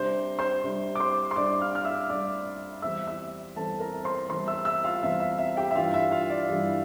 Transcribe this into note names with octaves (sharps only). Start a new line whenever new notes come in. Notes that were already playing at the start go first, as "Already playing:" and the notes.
Already playing: C3 G3 D4 C5 C6
C5 C6
C3 G3 D4
D6
C5 C6
C6
C3 G3 D4 D5 D6
F5 F6
F6
E5 E6
C3 G3 D4 D5 D6
E2 C3 G3 C4 E5 E6
E5 E6
E2 C3 G3 C4 A4 A5
A#4 A#5
C5 C6
E2 C3 G3 C4 C5 C6
E5 E6
E5 E6
F4 F5
E2 C3 G3 C4 E5
E5
E5
G4 G5
E5
G2 E3 G3 F4 F5
E5
F4 F5
D5
G2 E3 G3